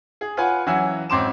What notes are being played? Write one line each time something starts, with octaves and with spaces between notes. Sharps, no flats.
G#4
F4 B4 C#5 F#5 G#5
E3 F#3 C#4 F#5 G#5 E6
G#1 C4 C#4 C6 D6 E7